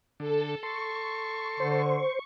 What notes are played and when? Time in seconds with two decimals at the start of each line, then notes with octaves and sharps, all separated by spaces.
0.20 D3 A4
0.63 A4 C6 C#6
1.60 D3 C5